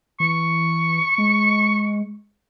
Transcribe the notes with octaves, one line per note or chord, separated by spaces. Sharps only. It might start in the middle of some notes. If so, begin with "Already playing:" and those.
E3 C#6
G#3